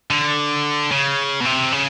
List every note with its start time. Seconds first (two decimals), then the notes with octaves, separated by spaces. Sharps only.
0.11 D3
0.92 C#3
1.41 B2
1.45 C3
1.72 C#3